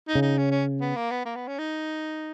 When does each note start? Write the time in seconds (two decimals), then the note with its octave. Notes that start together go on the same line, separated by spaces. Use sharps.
0.08 D#4
0.15 C#3
0.22 D#4
0.38 C#4
0.51 C#4
0.81 B3
0.96 A#3
1.11 B3
1.25 A#3
1.36 B3
1.48 C#4
1.59 D#4